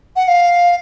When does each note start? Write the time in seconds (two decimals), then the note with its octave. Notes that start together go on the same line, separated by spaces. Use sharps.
0.16 F#5
0.28 F5